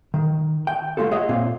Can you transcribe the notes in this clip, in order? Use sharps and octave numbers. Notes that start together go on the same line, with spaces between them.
D#3
G5
D3 G#3 A3 F4 F#4 A4
G#4 C#5 D#5 E5 F#5
A#2 C4 F4